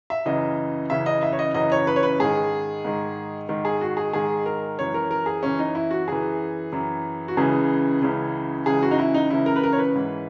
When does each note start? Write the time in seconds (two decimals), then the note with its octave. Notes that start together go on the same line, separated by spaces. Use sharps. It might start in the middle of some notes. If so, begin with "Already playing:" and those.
0.10 E5
0.25 F#2 C#3 E3 D#5
0.90 F#2 C#3 E3 E5
1.06 D#5
1.23 E5
1.33 C#5
1.39 D#5
1.54 F#2 C#3 E3 D#5
1.72 C#5
1.87 B4
1.96 C#5
2.03 B4
2.20 G#2 D#3 G#4
2.85 G#2 D#3
3.49 G#2 D#3
3.65 G#4
3.81 F#4
3.97 G#4
4.13 G#2 D#3 G#4
4.46 A#4
4.78 F#2 E3 C#5
4.94 A#4
5.11 A#4
5.26 G#4
5.43 F#2 E3 C#4
5.59 D#4
5.75 E4
5.91 F#4
6.07 F#2 E3 G#4
6.73 F#2 E3
7.28 F#4
7.37 C#2 C#3 E3 G#4
8.02 C#2 C#3 E3
8.66 C#2 C#3 E3 G#4
8.83 F#4
8.91 D#4
8.99 E4
9.14 D#4
9.30 C#2 C#3 E3 E4
9.46 A#4
9.56 B4
9.63 A#4
9.73 C#5
9.79 B4
9.95 G#2 E3